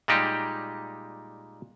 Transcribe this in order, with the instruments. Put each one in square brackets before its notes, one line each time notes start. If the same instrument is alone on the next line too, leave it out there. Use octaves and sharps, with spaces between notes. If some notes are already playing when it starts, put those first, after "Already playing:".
[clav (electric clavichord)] A#2 G3 G#3 D#4 G4